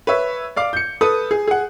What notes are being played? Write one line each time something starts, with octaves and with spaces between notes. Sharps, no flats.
B4 C#5 E5
D5 F5 D6
G6 C#7
A4 B4 D#6
G#4
G#4 F#5